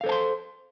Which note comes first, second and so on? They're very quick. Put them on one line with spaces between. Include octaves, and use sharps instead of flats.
F5 A4 C5 A5 C6